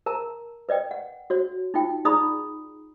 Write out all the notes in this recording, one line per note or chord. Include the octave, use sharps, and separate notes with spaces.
A#4 A5 A#5
B4 D5 D#5 G5
F#5
F#4 C#5
D#4 F4 G5
D#4 G#4 D5 A#5 B5 D#6